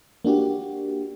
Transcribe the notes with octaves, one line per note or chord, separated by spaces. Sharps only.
A#3 D4 F#4 G4